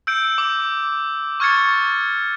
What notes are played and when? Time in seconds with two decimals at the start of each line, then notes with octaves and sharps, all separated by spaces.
0.07 E6 G6 D7
0.38 D6
1.40 C#6 F6 G#6 A6 C#7